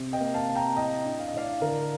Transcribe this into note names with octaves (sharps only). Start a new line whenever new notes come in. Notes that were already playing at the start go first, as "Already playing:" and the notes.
Already playing: C3
D#5 G5
A#3
F5 A5
C3
G5 A#5
A2 D#5 G5
D4
F5
D#5
A2 D5 F5
D3 A#4 D5